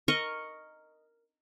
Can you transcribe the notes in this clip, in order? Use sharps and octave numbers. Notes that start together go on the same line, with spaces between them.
A#4 D#5 C#6